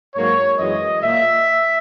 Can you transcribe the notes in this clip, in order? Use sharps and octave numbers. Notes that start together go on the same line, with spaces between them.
G#2 F#3 A#3 C#5
F#2 E3 G#3 D#5
A#2 A#3 E5